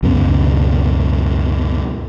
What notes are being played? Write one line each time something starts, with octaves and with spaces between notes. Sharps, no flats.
C#2 F#2 B2 C#4